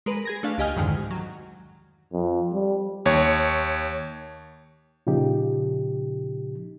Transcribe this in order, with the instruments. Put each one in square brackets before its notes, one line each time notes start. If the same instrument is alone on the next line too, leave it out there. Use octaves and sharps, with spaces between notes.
[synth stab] G#3 A#4 B4
G#4 G#6 A#6
A3 D4 F5
C#2 G4 D#5 G#5 F6
C2 F2 G#2 D3 D#3 G#3
F#3
[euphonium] F2
G3
[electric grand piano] D#2 C#5
[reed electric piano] A#2 C#3 F3 D#4 G4